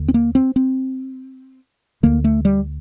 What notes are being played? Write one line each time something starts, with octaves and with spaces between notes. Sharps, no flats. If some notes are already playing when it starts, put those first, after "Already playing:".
Already playing: D#2 D3
C4
A#3
C4
C4
D2 D3 A#3
A3
G3